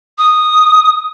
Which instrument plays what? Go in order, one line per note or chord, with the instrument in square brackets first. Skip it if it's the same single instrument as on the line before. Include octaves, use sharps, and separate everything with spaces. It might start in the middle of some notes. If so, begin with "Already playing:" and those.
[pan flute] D#6